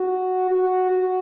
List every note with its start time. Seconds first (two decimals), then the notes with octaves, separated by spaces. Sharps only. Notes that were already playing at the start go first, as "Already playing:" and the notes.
Already playing: F#4
0.51 F#4
0.90 F#4